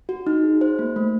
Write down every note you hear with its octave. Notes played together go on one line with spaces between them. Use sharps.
F#4
D#4
G#4
C5
A#3
A3